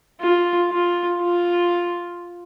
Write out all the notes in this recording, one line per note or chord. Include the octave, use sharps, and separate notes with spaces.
F4
F4
F4